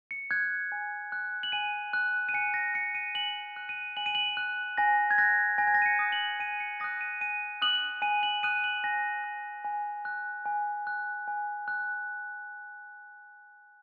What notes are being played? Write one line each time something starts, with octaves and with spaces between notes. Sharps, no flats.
C#7
F#6 G#6
G#5
F#6
F#7
G#5 D#7
F#6
D#7
G#5 C#7
A#6
F#6 C#7
D#7
G#5 F#7
F#6
D#7
G#5 F#7
D#7
F#7
F#6
G#5 A#6
G#6
F#6 A#6
G#5 A#6
G#6
A#6
D#7
C#7
D#6 F#6
F#7
G#5 D#7
C#7
D#6 F#6 A#6
D#7
G#5 D#7
D#6 F#6 F#7
G#5 D#7
F#7
D#6 F#6 D#7
F#7
G#5 A#6
F#6
G#5
F#6
G#5
F#6
G#5
F#6